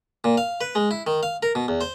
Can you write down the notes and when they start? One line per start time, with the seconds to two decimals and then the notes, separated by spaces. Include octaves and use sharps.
0.24 A#2
0.38 F5
0.61 B4
0.75 G#3
0.91 E4
1.07 D#3
1.23 F5
1.43 A#4
1.55 B2
1.68 E2
1.81 C5